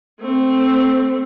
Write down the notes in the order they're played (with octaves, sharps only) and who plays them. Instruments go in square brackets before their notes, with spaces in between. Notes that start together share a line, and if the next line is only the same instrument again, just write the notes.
[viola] A3 C4